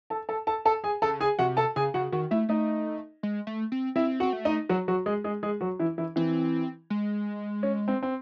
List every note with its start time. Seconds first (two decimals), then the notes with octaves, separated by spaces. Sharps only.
0.10 A4 A5
0.29 A4 A5
0.47 A4 A5
0.65 A4 A5
0.84 G#4 G#5
1.02 C#3 A4 A5
1.20 G#4 G#5
1.39 C3 F#4 F#5
1.57 A4 A5
1.76 C#3 G#4 G#5
1.94 C#3 F#4 F#5
2.12 D#3 F#4 F#5
2.31 A3 E4 E5
2.49 A3 D#4 D#5
3.23 G#3
3.47 A3
3.72 C4
3.96 C4 E4 E5
4.20 C4 F#4 F#5
4.33 A3
4.45 D#4 D#5
4.69 F#3 F#4
4.88 F#3 F#4
5.06 G#3 G#4
5.24 G#3 G#4
5.43 G#3 G#4
5.61 F#3 F#4
5.79 E3 E4
5.98 E3 E4
6.16 E3 C4 E4
6.90 G#3
7.63 C#4
7.88 C4
8.03 C4